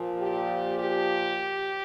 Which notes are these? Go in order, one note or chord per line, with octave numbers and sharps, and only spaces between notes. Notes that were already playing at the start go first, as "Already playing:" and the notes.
Already playing: A#2 F3
G4
G4